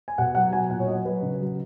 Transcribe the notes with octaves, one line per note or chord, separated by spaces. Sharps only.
G#5
B2 F#5
F#3 F#5
F#3 G#5
A#2 F#5
C#5
F#3 D#5
F#3 B4
C#3
F#3